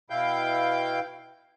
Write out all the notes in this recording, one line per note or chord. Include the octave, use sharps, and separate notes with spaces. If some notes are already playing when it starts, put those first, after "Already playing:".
B2 E4 F5 G5 G6